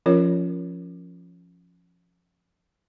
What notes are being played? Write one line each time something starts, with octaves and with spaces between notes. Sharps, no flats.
F3 C#4 F4 A#4 C#5